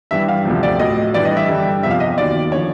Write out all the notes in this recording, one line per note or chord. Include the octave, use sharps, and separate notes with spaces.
G2 E3 G3 E5
F5
D2 C3 F3
D5
A2 F#3 D#5
G2 E3 G3 D5
D#5
E5
G2 D3 G3
E2 C3 F3 E5
F5
D#5
D#2 D#3 F#3 D5
D3 F3 C#5